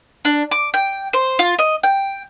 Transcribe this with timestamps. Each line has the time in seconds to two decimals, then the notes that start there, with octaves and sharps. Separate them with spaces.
0.25 D4
0.51 D6
0.74 G5
1.13 C5
1.39 F4
1.59 D#5
1.83 G5